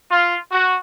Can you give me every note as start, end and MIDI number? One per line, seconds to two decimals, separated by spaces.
0.10 0.35 65
0.52 0.76 66